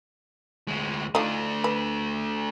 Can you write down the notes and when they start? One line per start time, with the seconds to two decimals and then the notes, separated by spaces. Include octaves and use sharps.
0.68 D2 G#3
1.15 D3 F3 A3 D4 D#4
1.64 B4